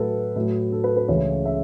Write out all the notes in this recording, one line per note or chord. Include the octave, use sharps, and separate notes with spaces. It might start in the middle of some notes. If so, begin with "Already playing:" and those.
Already playing: A2 F#3 A3 F#4 A4 B4
A2 F#3 A3
A4
B4
B4
C#2 C#3 E3 A3 C#5
E5